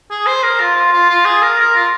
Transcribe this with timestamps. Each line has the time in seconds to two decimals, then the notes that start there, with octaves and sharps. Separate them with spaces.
0.11 G#4
0.26 C5
0.43 A#4
0.60 F4
0.76 F4
0.92 F4
1.09 F4
1.25 G#4
1.42 A#4
1.59 A#4
1.75 F4